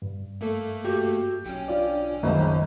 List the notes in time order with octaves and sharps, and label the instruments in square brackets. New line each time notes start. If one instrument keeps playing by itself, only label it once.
[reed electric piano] G2
[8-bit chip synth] A3 A#3 A4
[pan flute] F#4 [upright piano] G4
[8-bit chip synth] B1 C#4 [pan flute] G5
[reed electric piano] D4 F4 D5
[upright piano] F#1 C#2 [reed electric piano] D#3 [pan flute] C5